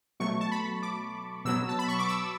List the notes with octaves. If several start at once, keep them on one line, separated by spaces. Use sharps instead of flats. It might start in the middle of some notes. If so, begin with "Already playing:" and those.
B2 F#3 A3 C#6
A5
B5
D6
B2 F#3 B3 E6
A5
B5
C#6
D6
E6